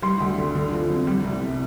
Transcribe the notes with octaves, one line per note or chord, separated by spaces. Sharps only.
G3 C6
D2
D3
D3
F3
F2
G3
C2
C3